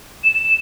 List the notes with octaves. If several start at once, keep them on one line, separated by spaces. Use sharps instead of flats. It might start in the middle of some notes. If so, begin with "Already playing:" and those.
E7